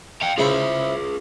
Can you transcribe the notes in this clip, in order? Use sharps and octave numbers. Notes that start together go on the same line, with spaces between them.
F5 G5
C#3 E4 F4 G#4 C5